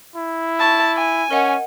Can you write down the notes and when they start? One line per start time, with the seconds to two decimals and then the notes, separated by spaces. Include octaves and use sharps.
0.16 E4
0.59 A5 B5 C#6
0.96 G#5
1.31 C#4 A#4 D#5 F#5